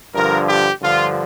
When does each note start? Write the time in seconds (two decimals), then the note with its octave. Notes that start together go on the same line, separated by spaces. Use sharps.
0.15 G2 D3 F3 A#4
0.48 G4
0.82 G2 D3 F3 F4